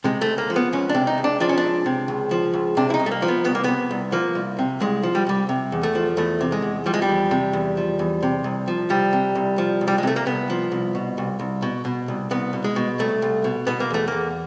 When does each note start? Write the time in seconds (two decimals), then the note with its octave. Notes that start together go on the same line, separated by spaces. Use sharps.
0.04 C3 G#3
0.21 C#2 A3
0.38 A#3
0.50 F3
0.56 B3
0.73 C#2 C#4
0.89 D4
0.94 C3
1.07 D#4
1.18 C#2
1.24 D4
1.40 F3 D4
1.49 C#4
1.58 D4
1.64 C#2
1.86 C3
2.08 C#2
2.31 F3
2.53 C#2
2.77 C3 D4
2.90 E4
2.94 D#4
2.99 C2
3.06 A3
3.11 A#3
3.22 F3
3.28 B3
3.44 C2 B3
3.55 A#3
3.64 C3 B3
3.91 C2
4.12 F3 A#3
4.35 C2
4.59 C3
4.80 C2 G#3
5.03 F3
5.15 G3
5.27 C2 G3
5.49 C3
5.72 E2
5.83 A3
5.95 F3
6.17 E2 A3
6.41 C3
6.52 G#3
6.62 E2
6.86 F3 G3
6.94 G#3
7.02 G3
7.09 E2
7.31 C3
7.53 E2
7.77 F3
7.99 E2
8.23 C3
8.44 C2
8.68 F3
8.90 C2 G3
9.13 C3
9.35 C2
9.58 F3
9.81 C2
9.88 G3
9.98 G#3
10.03 C3 A3
10.16 A#3
10.26 C2 B3
10.50 F3
10.72 C2
10.95 B2
11.18 C2
11.39 C2
11.62 B2
11.85 B2
12.08 C2
12.31 C2 B3
12.53 B2
12.64 G#3
12.76 B2
12.99 C2 A3
13.22 C2
13.44 B2
13.67 B2 B3
13.80 A#3
13.90 E2 A3
14.08 E2 A#3